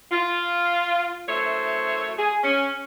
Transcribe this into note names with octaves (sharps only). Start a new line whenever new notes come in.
F4
F#2 A3 E4 C5 C#5
G#4
C#4